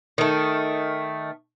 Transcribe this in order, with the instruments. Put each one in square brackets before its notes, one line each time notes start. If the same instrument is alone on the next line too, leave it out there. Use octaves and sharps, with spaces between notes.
[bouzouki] D#3 A3